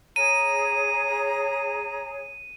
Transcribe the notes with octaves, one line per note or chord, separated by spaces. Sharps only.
G#4 C#5 A#5 D#7